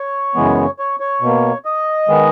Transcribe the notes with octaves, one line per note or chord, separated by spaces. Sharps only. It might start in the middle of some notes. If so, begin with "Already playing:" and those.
Already playing: C#5
F#2 C#3 E3 G#3 B3
C#5
C#5
B2 A#3
D#5
D#3 G#3 B3